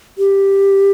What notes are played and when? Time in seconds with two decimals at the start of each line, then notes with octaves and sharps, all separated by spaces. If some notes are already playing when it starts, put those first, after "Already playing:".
0.18 G4